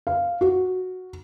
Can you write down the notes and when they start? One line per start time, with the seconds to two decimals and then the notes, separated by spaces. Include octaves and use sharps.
0.07 F5
0.41 F#4